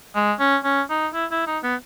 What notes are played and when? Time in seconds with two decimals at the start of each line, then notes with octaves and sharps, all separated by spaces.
0.15 G#3
0.40 C#4
0.64 C#4
0.90 D#4
1.14 E4
1.31 E4
1.47 D#4
1.63 B3